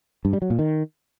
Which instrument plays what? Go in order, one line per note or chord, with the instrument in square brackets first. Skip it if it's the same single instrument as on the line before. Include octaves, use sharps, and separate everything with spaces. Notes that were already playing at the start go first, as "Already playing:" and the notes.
[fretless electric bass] G2
G3
F#3
A#2
D#3